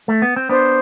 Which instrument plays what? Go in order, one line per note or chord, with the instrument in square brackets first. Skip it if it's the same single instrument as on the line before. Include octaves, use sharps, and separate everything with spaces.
[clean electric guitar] A3
B3
C4
[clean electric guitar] B3 D4 [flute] C5